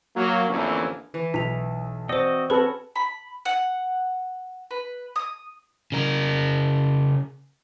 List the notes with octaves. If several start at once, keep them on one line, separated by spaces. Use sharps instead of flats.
F#3 A#3
A1 F2 D3 E3 A#3 C#4
E3
B1 B6 F7
C4 F#4 C5 D5 D#5
C4 C#4 F#4 A4 B4 B5
B5
F#5
B4
D#6
C#3 A#4